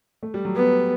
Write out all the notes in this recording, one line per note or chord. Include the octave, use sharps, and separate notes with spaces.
A3
G3
F#3
B3